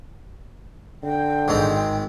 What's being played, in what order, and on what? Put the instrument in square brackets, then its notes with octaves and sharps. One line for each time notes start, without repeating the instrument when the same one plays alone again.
[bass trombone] D3 [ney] G5
[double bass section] G#1 [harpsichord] G#2 D#3 C4